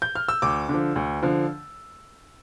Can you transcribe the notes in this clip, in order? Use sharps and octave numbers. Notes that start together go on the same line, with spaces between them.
G6
F6
E6
D2 D6
D3 F3
D2
D3 F3